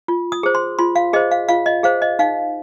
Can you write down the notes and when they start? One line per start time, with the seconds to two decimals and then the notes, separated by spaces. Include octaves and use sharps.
0.08 F4
0.32 D#6
0.43 G#4 C5
0.55 C6
0.79 F4 C6
0.96 F5
1.13 G#4 C5 D#5
1.31 F5
1.49 F4 F5
1.66 D#5
1.83 G#4 C5 F5
2.02 D#5
2.19 D#4 F5